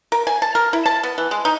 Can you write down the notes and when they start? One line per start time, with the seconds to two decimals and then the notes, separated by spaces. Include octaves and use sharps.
0.12 A#4
0.27 G#5
0.42 A5
0.55 A#4
0.73 E4
0.86 A5
1.03 B3
1.18 E3
1.31 G#3
1.45 D#4